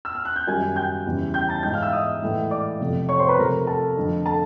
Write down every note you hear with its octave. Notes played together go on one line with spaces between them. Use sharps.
E6
F6
F#6
G6
F#2 D#3 G3 G#5 G#6
G5 G6
E2 C#3 E3 G3
G5 G6
A5 A6
G#2 E3 G#3 G5 G6
F5 F6
E5 E6
D#5 D#6
A2 E3 G#3
D5 D6
F2 C3 F3 A3
C#5 C#6
C5 C6
B4 B5
C3 F3 A3 A#4 A#5
A4 A5
F2 D3 F3 A3
A4 A5